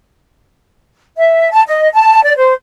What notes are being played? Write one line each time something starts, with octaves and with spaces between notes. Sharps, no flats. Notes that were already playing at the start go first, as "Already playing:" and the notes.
E5
A5
D#5
A5
D5
C5